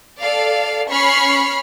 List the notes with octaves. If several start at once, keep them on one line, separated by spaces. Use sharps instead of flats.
A4 D5 F5
C#4 B5 C#6 F6 C7